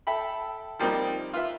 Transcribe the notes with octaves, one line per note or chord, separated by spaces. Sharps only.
A4 E5 G5 B5
F3 G3 A#3 C4 D#4
F4 B4 E5